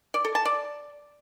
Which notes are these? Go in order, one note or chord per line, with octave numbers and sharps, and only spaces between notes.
D5
A4
A5
D5